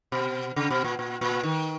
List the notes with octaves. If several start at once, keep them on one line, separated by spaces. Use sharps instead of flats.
B2
C#3
B2
A#2
A#2
A#2
D#3